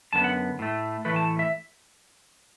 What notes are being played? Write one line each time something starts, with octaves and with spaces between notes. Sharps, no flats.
F#2 D3 B3 A5
F#5
A2 A3
A2 E3 A3 B4
A5
E5